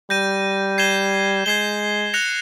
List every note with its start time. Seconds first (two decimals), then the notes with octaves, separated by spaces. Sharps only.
0.10 G3 G6 A#6 D#7
0.78 G#6 C7 E7 G7
1.46 G#3 G#6 C7 E7 G7
2.14 F#6 A#6 C#7 F7